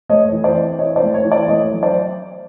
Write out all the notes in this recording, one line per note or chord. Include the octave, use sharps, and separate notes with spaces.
A3 C#5 D#5
E3
C5 D5
C4
E4 C#5 D#5
C5 D5
A3
C#5
E3
C5 D5
A3 C#5 D#5
F#3
C5 D5